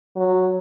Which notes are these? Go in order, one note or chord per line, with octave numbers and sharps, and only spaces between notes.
F#3